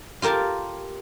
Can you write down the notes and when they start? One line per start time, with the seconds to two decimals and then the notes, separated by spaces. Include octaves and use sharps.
0.22 F4 G4 A#4 A5